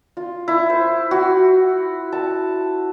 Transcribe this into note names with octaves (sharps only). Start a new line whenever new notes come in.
F4
E4
C5
F#4
A5